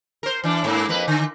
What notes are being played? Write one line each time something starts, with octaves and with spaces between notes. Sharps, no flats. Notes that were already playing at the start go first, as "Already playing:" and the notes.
A#4 C5
E3 D4
G#2 A#3
F2 A#3 B4
D3